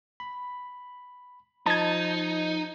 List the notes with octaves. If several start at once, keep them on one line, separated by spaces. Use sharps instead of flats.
B5
F3 D#4 D#5 A5 G#6